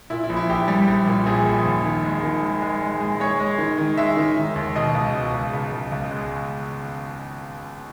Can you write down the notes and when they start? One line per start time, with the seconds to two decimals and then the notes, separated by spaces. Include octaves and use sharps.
0.10 A#2 E4
0.24 E4
0.29 A#1
0.37 E4
0.49 A#1 G4
0.68 G3
0.87 A#1
1.07 A#2
1.26 A#1 G#4
1.46 A#1
1.65 D#2
1.85 D#3
2.04 G#3
2.23 D#3
2.43 G#3
2.62 G#3
2.82 G#3
3.00 G#3
3.20 G#3 C#5
3.40 G#3
3.58 D#3
3.78 D#3
3.98 G#3 E5
4.17 D#3
4.37 D#3
4.56 D#2
4.75 B2 D#5
4.95 C#2
5.14 B2
5.34 C#2
5.53 C#2
5.72 C#2
5.92 C#2
6.11 G#3